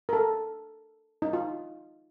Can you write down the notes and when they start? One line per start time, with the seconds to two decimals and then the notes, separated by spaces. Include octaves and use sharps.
0.09 A#4
0.13 A4
1.22 D#4
1.33 F4